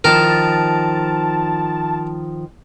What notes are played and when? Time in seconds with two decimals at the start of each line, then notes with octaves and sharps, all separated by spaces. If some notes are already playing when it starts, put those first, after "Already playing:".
0.04 D#3 F3 A#4 A5